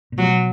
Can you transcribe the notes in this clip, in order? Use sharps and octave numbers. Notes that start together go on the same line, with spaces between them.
A#2
B2 F#3